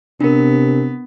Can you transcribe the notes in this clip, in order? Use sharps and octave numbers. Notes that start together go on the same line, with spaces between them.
C3 B3 D4 A#4